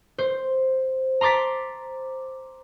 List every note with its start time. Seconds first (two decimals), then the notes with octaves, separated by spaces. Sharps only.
0.18 C5
1.21 A#5 C6 D6 A6 B6